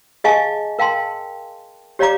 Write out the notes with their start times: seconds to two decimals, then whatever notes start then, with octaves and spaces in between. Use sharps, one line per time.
0.24 G#4 D#5 F5 G#5 A5 C#6
0.79 A#4 F5 G5 A5 C6
1.99 G4 C#5 D5 F5 A#5 D6